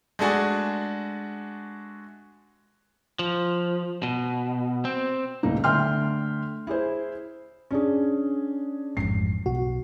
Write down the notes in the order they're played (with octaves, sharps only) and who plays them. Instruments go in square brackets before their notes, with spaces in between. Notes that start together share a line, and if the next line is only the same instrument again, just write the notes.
[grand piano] G#3 A3 D4 F#4 G#4
[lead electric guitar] F3
B2
C4
[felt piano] C#2 A#2 A3 A#3 D#4
D3 A3 E5 G5 C6 F6
E4 G#4 C5
C#4 D4 G#4
[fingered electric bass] A1 F2 G#2 [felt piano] C7
[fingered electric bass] B1 [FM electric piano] F#4